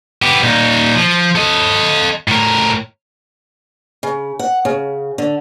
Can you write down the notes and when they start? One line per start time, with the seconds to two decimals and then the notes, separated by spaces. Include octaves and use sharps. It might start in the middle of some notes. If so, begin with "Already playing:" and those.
0.22 B3 G4
0.43 A#2 D#4
0.95 F3
1.35 A4 D#5
2.28 A2 A#4
4.03 C#3
4.39 F#5
4.65 C#3
5.18 D3